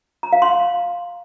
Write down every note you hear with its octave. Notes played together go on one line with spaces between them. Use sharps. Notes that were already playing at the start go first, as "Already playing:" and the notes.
A#5
F5
C6